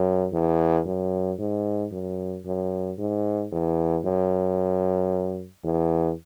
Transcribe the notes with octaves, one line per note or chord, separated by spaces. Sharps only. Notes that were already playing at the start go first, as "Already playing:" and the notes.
Already playing: F#2
E2
F#2
G#2
F#2
F#2
G#2
E2
F#2
E2